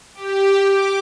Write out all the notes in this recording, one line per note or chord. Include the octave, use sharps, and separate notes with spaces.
G4
D6